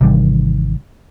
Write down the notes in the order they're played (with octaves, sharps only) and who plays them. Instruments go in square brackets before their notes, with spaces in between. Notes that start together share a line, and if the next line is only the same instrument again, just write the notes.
[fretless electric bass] G#1 D#3 [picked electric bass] C3 E3 G3